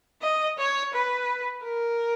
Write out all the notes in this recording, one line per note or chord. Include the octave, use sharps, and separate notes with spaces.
D#5
C#5
B4
A#4